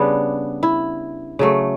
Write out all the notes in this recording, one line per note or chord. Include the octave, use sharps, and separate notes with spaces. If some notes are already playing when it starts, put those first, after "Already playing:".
Already playing: C#3 G3 B3 D4
E4
C#3 F#3 A3